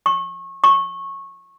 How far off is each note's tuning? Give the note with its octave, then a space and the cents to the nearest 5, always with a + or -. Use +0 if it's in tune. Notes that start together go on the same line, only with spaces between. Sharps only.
C#6 -25
C#6 -15